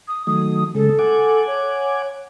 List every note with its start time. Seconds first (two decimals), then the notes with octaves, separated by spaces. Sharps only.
0.08 D#6
0.27 D#3 F#3 A3 D#6
0.75 C#3 G#3 A4
0.99 F#5 G#5 D6
1.47 C#5